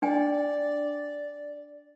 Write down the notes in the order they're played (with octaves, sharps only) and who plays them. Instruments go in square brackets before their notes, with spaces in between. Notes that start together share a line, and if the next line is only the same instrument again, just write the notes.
[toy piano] D4 G5 G#5 [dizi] D5